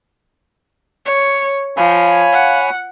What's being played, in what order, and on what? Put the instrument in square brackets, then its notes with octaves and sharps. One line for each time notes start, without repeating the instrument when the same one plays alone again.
[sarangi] C#5
[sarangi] F3 [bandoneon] C#5 G#5 B5 [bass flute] F5
[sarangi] F#5